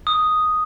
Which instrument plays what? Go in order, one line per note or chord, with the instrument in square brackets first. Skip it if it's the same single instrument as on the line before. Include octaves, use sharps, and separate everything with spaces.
[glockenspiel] D#6